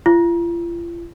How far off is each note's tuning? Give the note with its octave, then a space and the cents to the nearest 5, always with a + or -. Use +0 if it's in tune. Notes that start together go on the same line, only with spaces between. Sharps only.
F4 -40